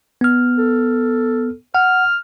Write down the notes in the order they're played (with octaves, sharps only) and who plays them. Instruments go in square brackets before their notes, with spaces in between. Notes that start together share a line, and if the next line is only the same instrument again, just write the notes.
[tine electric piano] B3 F6
[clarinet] A4
[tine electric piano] F#5 [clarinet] F6